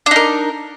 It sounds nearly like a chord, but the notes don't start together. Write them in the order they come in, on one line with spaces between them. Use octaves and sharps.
D4 D#4 A#4